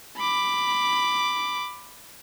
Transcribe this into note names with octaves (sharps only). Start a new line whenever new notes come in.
B5 D6